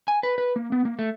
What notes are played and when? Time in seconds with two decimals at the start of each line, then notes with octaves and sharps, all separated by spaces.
0.08 G#5
0.23 B4
0.38 B4
0.56 A#3
0.72 B3
0.85 A#3
0.99 A3